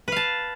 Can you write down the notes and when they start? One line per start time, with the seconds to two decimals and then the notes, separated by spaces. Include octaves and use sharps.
0.08 B4
0.12 F5
0.16 A5